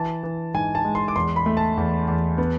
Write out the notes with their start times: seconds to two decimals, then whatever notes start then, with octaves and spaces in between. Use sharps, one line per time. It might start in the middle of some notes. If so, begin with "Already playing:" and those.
Already playing: E3 A5
0.23 E3
0.54 G#2 G#5
0.75 A5
0.85 G#3
0.95 C6
1.08 D6
1.16 E2 C6
1.36 B5
1.46 A3
1.57 A5
1.77 E2
2.08 E2
2.38 B3